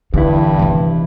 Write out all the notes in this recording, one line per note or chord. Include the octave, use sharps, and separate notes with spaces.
E2 G2 D3 E4
C3 D#3